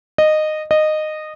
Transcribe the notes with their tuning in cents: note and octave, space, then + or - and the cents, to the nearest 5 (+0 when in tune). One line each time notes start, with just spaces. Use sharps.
D#5 -15
D#5 -15